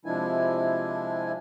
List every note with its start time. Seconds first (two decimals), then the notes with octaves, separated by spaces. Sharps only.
0.05 C3 F3 G#3 D4 E4 G#5